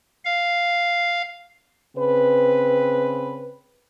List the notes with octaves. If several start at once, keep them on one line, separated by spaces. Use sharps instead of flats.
F5
C#3 C4 B4